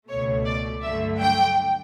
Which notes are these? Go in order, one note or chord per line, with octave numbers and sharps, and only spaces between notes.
C#2 B2 A3 C#5
D5
G2 D3 F#3 A3 E5
G5